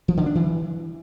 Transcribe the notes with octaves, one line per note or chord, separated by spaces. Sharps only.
F3
D3
D4
E3